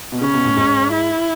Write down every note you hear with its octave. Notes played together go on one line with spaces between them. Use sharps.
B2
C#3 C#4
B2
A2
G#2
E4